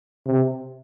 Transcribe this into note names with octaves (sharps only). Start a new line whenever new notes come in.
C3